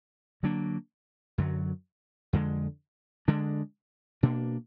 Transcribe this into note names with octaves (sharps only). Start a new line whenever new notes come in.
D3 F#3 A#3 D4
F#2 D3 F#3
F2 D3 G#3
D3 G#3 D4
B2 A#3 D4